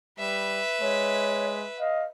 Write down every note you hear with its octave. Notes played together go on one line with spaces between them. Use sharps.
G3 B4 E5
G#3 C#5
D#5 F5